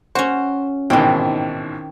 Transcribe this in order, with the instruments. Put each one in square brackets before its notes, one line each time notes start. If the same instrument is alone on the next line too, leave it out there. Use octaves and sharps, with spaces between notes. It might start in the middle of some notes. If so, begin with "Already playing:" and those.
[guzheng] C#4 F#4 [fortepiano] C5
[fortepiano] A1 G#2 B2 [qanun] D#3 C4